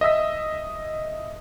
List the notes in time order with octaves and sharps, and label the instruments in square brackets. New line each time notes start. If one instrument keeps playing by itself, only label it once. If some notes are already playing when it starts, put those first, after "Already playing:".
[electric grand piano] D#5 E5 E6 B6